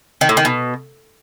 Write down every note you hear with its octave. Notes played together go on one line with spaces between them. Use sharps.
D#3
A2
D#3
B2